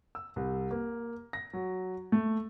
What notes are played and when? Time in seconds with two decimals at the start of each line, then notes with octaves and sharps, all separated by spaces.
0.15 E6
0.36 C2
0.71 A#3
1.33 A#6
1.53 F#3
2.12 A3